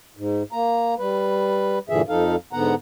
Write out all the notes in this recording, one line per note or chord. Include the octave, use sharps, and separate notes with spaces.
G#2
A#3 A#5
G3 B4
G2 A#2 D3 E3 G#4 E5
F2 F3 D#4 A4 F5
G#2 D3 B3 F#5 A#5